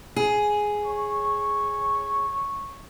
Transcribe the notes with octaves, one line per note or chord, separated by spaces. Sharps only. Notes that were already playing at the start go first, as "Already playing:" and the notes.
G#4
C#5 C#6